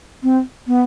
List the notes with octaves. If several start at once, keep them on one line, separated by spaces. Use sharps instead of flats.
C4
B3